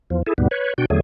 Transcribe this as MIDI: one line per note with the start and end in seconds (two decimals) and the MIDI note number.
0.10 0.22 40
0.10 0.22 53
0.27 0.33 64
0.27 0.33 68
0.27 0.33 69
0.38 0.48 39
0.38 0.48 44
0.38 0.48 47
0.38 0.48 55
0.38 0.48 59
0.51 0.74 71
0.51 0.74 73
0.78 0.85 47
0.78 0.85 62
0.78 0.85 66
0.78 0.85 79
0.90 1.00 40
0.90 1.00 50
0.90 1.00 54
0.90 1.00 57
0.90 1.00 68